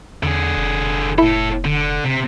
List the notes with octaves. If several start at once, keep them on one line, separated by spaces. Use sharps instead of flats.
E2 D3 G#4
F1
A2 E4 A4
D3
C3